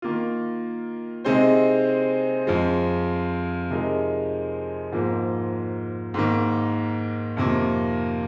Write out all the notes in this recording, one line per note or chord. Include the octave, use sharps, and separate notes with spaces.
D#3 A#3 F4
C3 G#3 C4 D#4 C5
F2 F3 G#3
C3 F3 G#3 D#4 A#4
G#2 F3 A#3
G#2 D#3 A#3
F2 C3 D#3 A#3